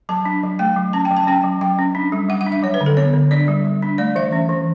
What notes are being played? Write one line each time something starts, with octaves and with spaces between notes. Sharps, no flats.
F#3 A5
D4
F#3
A3 G5
F#3
C#4 A5
G5
F#3
A5
C#4 G5
F#3
F#3 G5
C#4
D4
G3
G3 F#5
F#5
D4
E5
F#3 C#5
B4
D3
A4
B3 C#5
D3
D4 D5
G3
G3
D4
A3 D5
E3 E5
C#4
E3